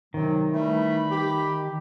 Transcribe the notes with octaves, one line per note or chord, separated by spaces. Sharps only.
C3 D#3 F#3
E3 G3 A3 B5
G4